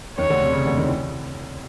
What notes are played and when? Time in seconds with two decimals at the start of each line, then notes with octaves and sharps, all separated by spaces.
0.18 D#2 D#3 C#5
0.30 D2 D3
0.41 C3
0.53 C#3
0.65 D2 D3
0.77 D#2 D#3
0.88 E3